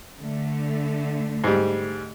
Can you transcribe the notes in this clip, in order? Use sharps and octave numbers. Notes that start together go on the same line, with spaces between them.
D3 A3
G#2 G3